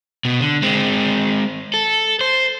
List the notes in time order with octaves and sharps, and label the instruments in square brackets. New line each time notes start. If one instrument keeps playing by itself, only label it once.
[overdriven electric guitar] B2
D3
G#3 C4
A4
C5